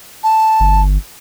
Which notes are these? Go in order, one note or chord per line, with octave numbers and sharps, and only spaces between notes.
A5
G1